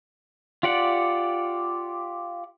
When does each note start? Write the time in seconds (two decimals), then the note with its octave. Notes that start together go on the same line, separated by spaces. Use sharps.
0.63 F4 G4 D5 F#5